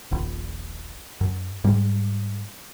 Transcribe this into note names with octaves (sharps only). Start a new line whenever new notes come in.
D#1 A#1
F#2
G#2 G3